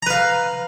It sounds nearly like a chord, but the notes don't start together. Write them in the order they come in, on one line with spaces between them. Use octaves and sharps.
A#5 B4 F5